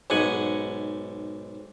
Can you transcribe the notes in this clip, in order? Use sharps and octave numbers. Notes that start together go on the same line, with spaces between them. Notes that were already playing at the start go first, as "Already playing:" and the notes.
B1 G#2 F#5 G#5